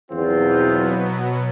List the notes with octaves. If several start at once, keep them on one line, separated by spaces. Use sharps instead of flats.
E2 B2 F#3 B3 C4 F4